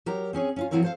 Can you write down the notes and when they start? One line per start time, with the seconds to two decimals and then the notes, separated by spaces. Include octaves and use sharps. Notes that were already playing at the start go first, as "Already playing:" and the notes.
0.06 F#3 G4 A#4 A#5
0.33 C4 C#4 G#4 C#5
0.56 C#4 E4 F4
0.71 F3 F#3 C4 E4 A#4 C#5
0.83 A4 C5 F5